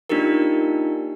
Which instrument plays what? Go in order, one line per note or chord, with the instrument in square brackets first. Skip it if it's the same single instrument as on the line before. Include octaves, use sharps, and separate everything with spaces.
[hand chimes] A#3 D4 D#4 F4 G4 A#4